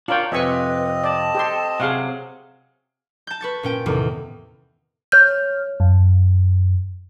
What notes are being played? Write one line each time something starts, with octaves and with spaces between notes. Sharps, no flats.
D4 F4 A#4 C#5 G5
F2 C3 C4 B4 D#5 E5 G#5 C#6
D5 A5
G4 A4 C6
C3 F#3 G#4 F5 F#5
A5 G6
B4 C#6 A6
A#2 C#4 G5
E2 A2 C3 D#3
C#5 F6 G6
F#2